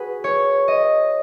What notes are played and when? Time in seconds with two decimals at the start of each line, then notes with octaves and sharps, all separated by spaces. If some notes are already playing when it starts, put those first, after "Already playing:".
Already playing: F#4 G#4 B4
0.24 C#5
0.68 D#5